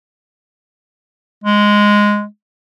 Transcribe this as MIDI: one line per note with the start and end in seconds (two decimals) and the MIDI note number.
1.44 2.25 56